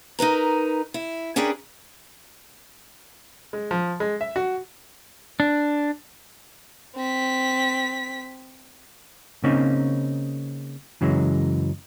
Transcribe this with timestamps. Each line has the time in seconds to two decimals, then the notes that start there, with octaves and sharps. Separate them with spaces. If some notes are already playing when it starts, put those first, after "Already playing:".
0.19 D#4 A#4 B4 A#5
0.94 E4
1.36 C#4 D4 G#4 A#4 B4 G5
3.53 G#3
3.71 F3
4.00 G#3
4.21 E5
4.36 F#4
5.40 D4
6.96 C4 B6
9.44 C#3 A#3 C4 C#4 D#4
11.01 F#2 C#3 E3 F#3 G#3